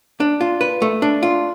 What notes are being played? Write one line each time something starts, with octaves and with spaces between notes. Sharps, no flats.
D4
F4
B4
A3
D4
F4